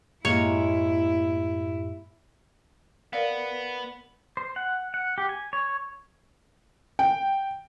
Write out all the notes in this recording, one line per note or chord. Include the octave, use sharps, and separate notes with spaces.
F#2 A2 G#3 A#3 E4 G4 C#5
B3 A#4 D5 F5
C5
F#5
F#5
G4
G#5
C#5
G5